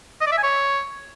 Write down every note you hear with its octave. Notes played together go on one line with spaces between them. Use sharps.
D#5
D5
E5
G#5
C#5